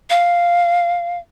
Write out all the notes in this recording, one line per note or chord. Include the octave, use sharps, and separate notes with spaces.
F5